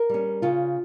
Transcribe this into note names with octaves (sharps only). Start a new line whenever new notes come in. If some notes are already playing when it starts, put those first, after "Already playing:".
Already playing: A#4
G3 C#4
C#3 F4